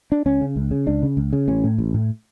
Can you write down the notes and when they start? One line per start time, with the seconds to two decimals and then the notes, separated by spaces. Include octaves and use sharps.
0.12 D4
0.26 C#2 C#4
0.41 C#3
0.56 C#2
0.71 C#3
0.87 C#2 D4
1.02 C#3
1.17 C#2
1.33 C#3
1.48 A1 C#4
1.64 A2
1.79 A1
1.94 A2